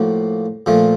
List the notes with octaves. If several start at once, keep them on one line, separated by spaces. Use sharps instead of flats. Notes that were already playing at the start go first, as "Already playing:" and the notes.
Already playing: A2 F3 A#3 F#4
A#2 F3 A3